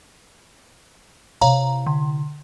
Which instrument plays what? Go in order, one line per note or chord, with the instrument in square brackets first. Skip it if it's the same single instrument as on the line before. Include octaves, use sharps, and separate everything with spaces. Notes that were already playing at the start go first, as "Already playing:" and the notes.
[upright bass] C3 E4 [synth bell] C#5 F5 A#5
[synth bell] D3